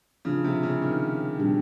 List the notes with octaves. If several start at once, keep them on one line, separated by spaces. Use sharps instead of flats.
C#3 F3 A3 D4 F4
C3
C#3
D#3
A#2 G3 B3 D4 G4